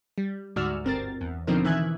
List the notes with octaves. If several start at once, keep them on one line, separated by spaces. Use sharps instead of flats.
G3
D2 G#2 F#4 D5 E6 F6
G1 C4 A#4 A6
E2
B2 D3 F3 C4 D#4 A#4
D#3 E3 E5 G#5 F#6 G#6